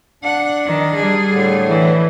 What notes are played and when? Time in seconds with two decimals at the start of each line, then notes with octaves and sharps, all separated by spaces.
0.23 D4 F#5
0.66 D#3
0.95 G3 G#4
1.32 A2 D3
1.68 E3